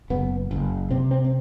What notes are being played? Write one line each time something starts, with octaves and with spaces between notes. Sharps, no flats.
F#1 B3
F#1
C3 C4
C4
C4